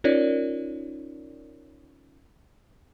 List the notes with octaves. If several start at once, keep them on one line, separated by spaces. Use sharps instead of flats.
C#4 D#4 F4 A#4 C#5 D5